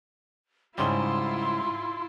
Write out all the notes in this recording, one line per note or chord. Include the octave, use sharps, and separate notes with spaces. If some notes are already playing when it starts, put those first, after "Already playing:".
G#2 C#3 G3 E4 F4 C6